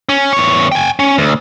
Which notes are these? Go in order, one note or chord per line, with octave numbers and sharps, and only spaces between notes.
C#4
E2 C#5
G5 G#5
C#4
D2